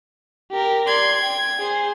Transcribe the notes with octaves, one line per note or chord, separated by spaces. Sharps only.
G4 A#4
D5 C6 G#6
G5
G#4 C5